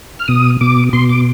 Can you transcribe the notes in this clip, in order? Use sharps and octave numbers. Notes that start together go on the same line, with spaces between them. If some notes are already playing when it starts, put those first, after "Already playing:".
F6
B2 D#6
B2 D6
B2 C6
D6